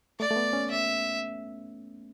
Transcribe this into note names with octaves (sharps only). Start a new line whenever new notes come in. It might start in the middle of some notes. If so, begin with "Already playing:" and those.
A3 D5
A3
B3
C#4
E5